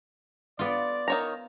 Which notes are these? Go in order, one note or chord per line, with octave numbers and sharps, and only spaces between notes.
B3 F4 D5
D#3 C#5 A#5